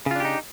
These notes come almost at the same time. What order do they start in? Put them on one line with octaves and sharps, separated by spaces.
C#3 F4 D4 G4 D#4